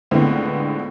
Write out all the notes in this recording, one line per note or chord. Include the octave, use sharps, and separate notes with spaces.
C#2 A2 D3 E3 B3 C4